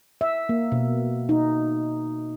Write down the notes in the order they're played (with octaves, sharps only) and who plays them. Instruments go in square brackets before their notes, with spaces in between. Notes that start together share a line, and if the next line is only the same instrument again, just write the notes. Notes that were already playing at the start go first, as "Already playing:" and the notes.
[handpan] E5
A#3
B2
D#4